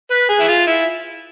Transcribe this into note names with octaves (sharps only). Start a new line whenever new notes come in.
B4
G#4
E4
F4
E4